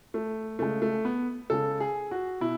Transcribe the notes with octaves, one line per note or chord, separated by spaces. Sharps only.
A3
C#3 G#3 A3
A3
B3
C#3 G#3 A4
G#4
F#4
B2 E4